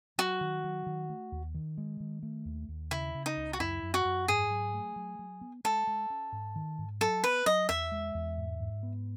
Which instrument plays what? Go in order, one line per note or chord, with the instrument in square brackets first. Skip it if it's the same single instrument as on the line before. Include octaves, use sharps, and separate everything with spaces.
[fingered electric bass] F#3 [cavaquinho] F#4
[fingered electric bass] D#3
F#3
D#3
A3
D#2
D#3
G#3
D#3
A3
D#2
D#2
[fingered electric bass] C#3 [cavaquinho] E4
[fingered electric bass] C#3
[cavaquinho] D#4
[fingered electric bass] C#2
[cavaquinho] F#4
[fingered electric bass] F#2 [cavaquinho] E4
[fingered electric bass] F#2
[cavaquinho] F#4
[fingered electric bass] F#2
[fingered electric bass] G#2 [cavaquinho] G#4
[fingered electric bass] F#3
A3
F#3
F#3
B3
[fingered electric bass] G#3 [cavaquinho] A4
[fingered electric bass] G#3
C#4
G#2
D#3
G#2
[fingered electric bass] F#3 [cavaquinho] A4
[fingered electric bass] B3 [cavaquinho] B4
[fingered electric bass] F#3 [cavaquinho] D#5
[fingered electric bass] E2 [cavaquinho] E5
[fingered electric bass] G#3
E2
G#2
G#2
B3